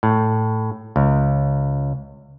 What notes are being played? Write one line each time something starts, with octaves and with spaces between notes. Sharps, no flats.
A2
C#2